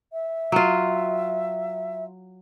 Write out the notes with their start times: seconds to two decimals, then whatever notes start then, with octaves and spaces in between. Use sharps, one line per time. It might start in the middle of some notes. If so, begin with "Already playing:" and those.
0.13 E5
0.52 F#3 F4